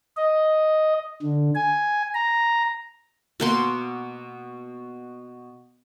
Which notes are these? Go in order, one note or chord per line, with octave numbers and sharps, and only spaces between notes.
D#5
D3
G#5
A#5
B2 A#3 C6